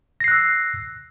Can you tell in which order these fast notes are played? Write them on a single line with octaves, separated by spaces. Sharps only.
A#6 C7 F#6 E6